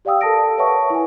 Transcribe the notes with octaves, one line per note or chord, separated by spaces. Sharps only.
G4 D5 F5 G5 D#6 E6
A4 A#4 A5 D#6 A#6 D7
B4 C#5 E5 F#5 A5 C#6
E4 G#5